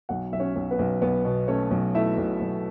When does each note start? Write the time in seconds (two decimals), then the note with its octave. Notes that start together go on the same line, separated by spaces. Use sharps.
0.09 B1 F#4 F#5
0.33 B1 E5
0.40 C#4 C#5
0.56 B1
0.71 B3 B4
0.79 B1
1.02 B1 B3 B4
1.25 B2
1.48 A3 C#4 C#5
1.71 B1
1.95 A3 E4 E5
2.18 B1
2.41 B1